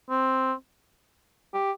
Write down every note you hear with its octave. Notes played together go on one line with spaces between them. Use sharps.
C4
G4